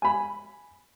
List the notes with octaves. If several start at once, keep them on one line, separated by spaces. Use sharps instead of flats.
G#5 B5